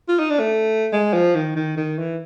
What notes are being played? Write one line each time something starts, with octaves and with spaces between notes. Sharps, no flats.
F4
D#4
D4
A3
G#3
F3
D#3
D#3
D#3
E3